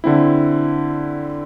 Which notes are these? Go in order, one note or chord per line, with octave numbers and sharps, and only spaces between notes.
D3 C4 E4